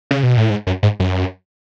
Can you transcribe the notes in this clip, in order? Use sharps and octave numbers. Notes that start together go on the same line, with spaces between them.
C#3
B2
A2
G#2
F#2
G#2
F#2